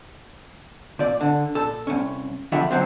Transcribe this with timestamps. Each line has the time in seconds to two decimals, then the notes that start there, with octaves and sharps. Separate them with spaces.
0.99 A#2 D5
1.21 D3
1.55 A#2 A4
1.87 C2 C#4
2.52 D3 F3 G3 F4 E5
2.71 D2 C3 D#3 F#3 C4